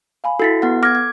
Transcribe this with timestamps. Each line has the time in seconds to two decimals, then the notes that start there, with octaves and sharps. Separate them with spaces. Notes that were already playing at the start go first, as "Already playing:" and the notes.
0.24 F5 G#5 B5
0.40 E4 F#4 A4 A6 B6
0.62 B3 F#5
0.83 D6 F6 G#6 A#6
0.95 G#6